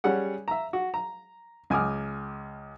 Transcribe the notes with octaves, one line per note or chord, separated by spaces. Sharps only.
G3 C#4 G#4 F#5
E5 A#5
F#4
A#5
C#2 G#5 D6 D#6 F6